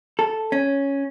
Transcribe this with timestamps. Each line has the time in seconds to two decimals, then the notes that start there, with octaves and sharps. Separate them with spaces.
0.19 A4
0.52 C#4